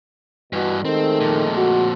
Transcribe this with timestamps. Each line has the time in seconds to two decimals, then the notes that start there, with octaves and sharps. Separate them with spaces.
0.53 G2 B2 E3
0.85 D#3 G#3 A3 C4 A4
1.20 F2 A#2
1.57 F#4